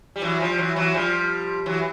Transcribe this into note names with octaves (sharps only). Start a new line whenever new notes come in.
G3
E3 F#3
F3 G3
E3 F#3
E3 F#3
F3 G3
E3 F#3